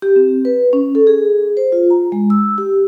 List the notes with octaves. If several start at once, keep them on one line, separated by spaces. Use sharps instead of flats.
G4
C4
B4
C#4
A4
G#4
C5
F4
A#5
G#3
E6
G4